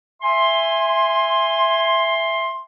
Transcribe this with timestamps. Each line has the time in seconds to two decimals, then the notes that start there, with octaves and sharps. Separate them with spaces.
0.22 E5 G#5 C6